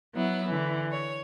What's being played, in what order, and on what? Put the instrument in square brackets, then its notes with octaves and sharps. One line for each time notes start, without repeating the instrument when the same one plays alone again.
[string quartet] F#3 B3 E4
D3 E3
C#5